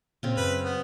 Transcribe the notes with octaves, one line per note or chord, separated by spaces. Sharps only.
A#2 C#3 C4
F#2 B4
B3